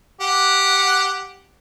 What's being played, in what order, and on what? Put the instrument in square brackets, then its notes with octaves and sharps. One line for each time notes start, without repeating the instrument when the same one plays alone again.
[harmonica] G4 F#5